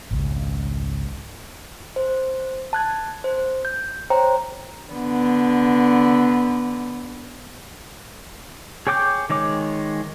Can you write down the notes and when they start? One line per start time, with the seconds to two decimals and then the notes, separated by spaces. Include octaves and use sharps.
0.11 G#1 C#2
1.96 C5
2.73 A5 F#6 G#6
3.24 C5
3.65 G6
4.10 C5 C#5 G5 A#5
4.91 D3 B3
8.87 G#4 C#5 G5 D6 G6
9.30 D#3 G#3 C#5 D6